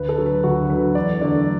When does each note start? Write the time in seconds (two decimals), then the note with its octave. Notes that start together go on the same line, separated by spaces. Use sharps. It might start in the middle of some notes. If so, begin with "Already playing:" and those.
Already playing: D2 B4
0.09 A4
0.18 D3 F#3
0.26 B4
0.44 D2 F#4
0.69 D3 F#3 B4
0.95 E2 D5
1.21 D3 F#3 A3 D5